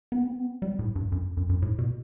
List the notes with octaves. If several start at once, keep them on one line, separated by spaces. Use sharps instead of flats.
B3
C4
B3
G3
A2
G2
F#2
F#2
F#2
A2
B2